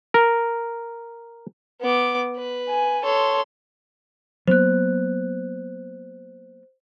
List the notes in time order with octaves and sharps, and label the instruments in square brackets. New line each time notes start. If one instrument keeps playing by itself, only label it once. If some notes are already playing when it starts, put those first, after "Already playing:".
[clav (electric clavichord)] A#4
[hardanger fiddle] B3 D6
B4
[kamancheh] G#5
[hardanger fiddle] A4 [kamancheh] C#5 C6
[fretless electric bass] F#3 A#3 B3 [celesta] C5 F#6